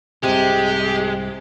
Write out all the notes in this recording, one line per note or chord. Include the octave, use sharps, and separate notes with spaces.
C2 G#2 C3 G#3 G4